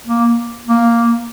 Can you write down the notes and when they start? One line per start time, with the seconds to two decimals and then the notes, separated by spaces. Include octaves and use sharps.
0.07 A#3
0.67 A#3